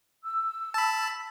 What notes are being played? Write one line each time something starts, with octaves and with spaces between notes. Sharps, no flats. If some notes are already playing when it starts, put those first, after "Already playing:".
E6
A5 B5